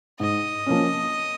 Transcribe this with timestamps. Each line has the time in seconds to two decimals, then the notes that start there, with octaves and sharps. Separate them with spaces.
0.20 G#2 D#5
0.66 F3 A#3 C#4